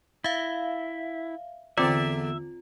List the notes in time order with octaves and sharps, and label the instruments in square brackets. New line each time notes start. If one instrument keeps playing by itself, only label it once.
[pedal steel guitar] E4 [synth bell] E5 F5
[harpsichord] E2 D3 [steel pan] C4 D5 [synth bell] F4 [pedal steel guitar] E5